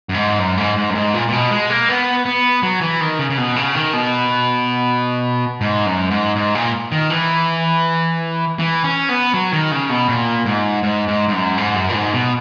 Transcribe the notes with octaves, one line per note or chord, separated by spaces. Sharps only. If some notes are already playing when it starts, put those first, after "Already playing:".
F#2
G#2
F#2
G#2
G#2
F#2
G#2
A#2
A#2
B2
G#3
A#3
B3
B3
F#3
E3
D#3
C#3
C#3
B2
C#3
D#3
B2
G#2
F#2
G#2
G#2
A#2
D#3
E3
E3
C#4
B3
F#3
D#3
C#3
B2
A#2
G#2
G#2
G#2
G#2
F#2
G#2
F#2
A#2
G#2
B2